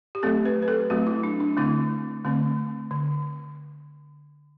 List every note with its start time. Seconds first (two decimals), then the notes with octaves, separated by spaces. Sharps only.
0.15 G4
0.23 F#3 A3 C4 A4
0.45 B4
0.62 B4
0.68 A4
0.90 F#3 A3 C4 F#4
1.07 E4
1.23 D4
1.40 D4
1.57 D3 A3 C4 E4
2.25 D3 A3 C4
2.91 D3